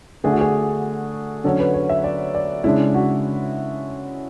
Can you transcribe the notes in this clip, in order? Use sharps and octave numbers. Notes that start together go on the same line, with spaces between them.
D3 A3 D4 G#4
F#4
G#4
D3 F#3 C#4 A4
B4
C#5
E5
D5
D5
C#3 G#3 D4 E4
F#4